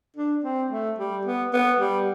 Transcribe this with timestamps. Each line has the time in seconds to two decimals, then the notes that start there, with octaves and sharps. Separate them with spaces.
0.17 D4
0.44 C4
0.71 A3
0.98 G3
1.25 B3
1.53 B3
1.80 G3